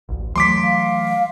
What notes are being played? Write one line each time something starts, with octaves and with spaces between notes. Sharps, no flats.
A1 D2
E3 F#3 A3 C6 D6 B6
F5